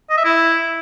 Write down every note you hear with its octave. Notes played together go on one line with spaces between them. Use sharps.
D#5
E5
E4